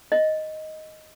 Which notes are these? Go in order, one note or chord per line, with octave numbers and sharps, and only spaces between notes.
D#5